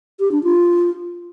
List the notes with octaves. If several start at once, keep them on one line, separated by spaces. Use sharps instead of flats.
G4
D4
F4